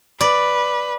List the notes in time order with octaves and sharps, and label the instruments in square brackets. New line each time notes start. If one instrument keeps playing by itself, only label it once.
[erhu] B4 [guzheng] D5